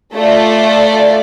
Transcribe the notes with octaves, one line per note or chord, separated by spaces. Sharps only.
A3 F4 A4 D5